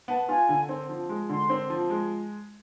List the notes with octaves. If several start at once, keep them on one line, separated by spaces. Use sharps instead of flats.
B3 A5
F4 G#5
D3
C4
F3
G#3
D3 C6
C4
F3
G#3